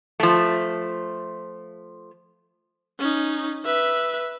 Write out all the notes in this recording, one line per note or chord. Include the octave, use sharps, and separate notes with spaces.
F3 A3
C#4 D#4
B4 E5